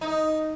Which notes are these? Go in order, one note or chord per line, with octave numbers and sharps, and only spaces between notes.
D#4